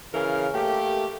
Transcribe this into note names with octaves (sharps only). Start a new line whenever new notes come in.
C#3 E3 A#4 F5
A3 A#3 G4